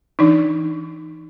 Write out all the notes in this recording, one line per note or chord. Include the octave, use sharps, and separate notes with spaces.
E3 D4 D#4